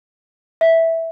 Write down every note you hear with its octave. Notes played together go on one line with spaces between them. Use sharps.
E5